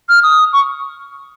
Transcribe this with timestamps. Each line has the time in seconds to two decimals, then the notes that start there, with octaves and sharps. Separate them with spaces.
0.09 F6
0.23 D#6
0.53 C#6